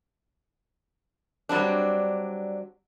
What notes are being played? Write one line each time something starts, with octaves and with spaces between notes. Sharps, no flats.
F#3 G3 C4 D4